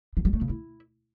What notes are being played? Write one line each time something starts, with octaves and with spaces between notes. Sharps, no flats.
F3
F#3
A3
C#3
E4